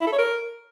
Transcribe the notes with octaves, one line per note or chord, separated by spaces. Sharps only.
E4
A4
C#5
A#4